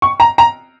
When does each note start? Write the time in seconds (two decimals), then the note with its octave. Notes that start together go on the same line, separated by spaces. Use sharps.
0.02 C#6
0.20 A#5
0.38 A#5